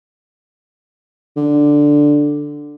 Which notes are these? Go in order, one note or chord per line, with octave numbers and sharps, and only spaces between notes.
D3